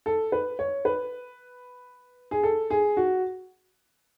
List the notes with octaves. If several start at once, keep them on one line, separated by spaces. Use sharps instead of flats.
A4
B4
C#5
B4
G#4
A4
G#4
F#4